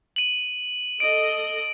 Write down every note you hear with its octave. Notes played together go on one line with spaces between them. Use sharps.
D#7 F#7
A4 D#5 D7